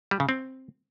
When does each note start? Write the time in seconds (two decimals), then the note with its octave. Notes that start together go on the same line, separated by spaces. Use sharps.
0.11 G3
0.20 C#3
0.29 C4